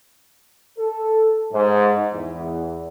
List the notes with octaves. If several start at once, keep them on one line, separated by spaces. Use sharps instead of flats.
A4
G#2
E2